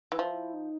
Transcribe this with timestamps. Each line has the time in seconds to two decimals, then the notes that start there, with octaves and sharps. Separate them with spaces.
0.12 E3
0.18 F3 E4
0.54 D#4